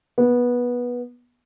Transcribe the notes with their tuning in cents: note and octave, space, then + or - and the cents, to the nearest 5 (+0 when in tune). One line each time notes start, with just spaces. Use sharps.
B3 -15